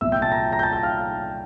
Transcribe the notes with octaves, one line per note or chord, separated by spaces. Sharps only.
C2 A#2 F3 E5 E6
G5 G6
A5 A6
A#5 A#6
A#5 A#6
G6
A5 A6
G5 G6
F5 F6